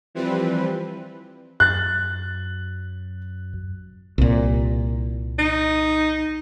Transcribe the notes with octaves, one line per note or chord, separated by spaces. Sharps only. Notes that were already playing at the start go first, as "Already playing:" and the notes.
E3 F3 G3 C4 B4
F#2 F#6 A6
C2 A#2
D#4